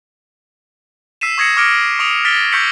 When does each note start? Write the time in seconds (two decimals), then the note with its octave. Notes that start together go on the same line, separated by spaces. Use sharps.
1.21 E6 B6 C7 D#7 E7
1.38 C#6 D#6 G#6 A#6 C7 C#7
1.56 C#6 D6 F6 A#6 C#7 D7
1.99 C#6 D#6 D7 F7
2.25 F6 A6 B6 D7 G7
2.52 C#6 E6 G6 B6 C#7 F#7